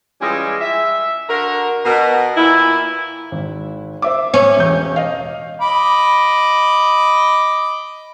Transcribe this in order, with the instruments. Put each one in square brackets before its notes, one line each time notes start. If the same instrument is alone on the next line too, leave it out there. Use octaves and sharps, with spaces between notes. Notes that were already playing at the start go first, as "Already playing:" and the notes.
[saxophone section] E3 G3 G#3 C#4 F4
E5
D3 F#4 A#4
B2 A#4
A#2 E3 E4
[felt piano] G#1
C5 E5 D6
[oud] C#4
[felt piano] E1 A1 G6
D#5 F5
[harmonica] D#5 B5 D6